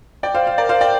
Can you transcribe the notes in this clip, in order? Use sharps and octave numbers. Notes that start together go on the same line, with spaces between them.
D5 G5
C5 F5
F5
A#4 D5
C5 F5
D5 G5